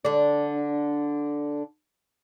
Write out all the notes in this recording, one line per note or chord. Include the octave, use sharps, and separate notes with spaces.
D3 D4